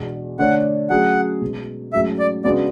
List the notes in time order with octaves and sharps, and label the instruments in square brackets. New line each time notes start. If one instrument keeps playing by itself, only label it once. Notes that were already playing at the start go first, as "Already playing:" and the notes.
Already playing: [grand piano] E2 B2 G#3 D4
[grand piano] D3 A3 D4 A4 C#5 [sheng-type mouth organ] F#5
[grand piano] F#3 A3 C#4 G#4 [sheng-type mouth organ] F#5
[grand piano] B2 G#3 B3
[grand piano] G#2 F#3 A3 C#4 G#4 [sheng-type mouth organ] E5
[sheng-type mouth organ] D5
[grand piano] C#3 G#3 B3 D4 F#4 [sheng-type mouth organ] D5